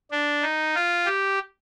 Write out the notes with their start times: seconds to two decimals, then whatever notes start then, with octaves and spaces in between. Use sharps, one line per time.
0.11 D4
0.42 D#4
0.75 F4
1.06 G4